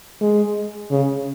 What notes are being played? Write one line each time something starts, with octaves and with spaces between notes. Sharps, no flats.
G#3
C#3